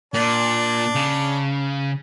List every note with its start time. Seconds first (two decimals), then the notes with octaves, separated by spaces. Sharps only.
0.14 A#2 D4
0.95 C#3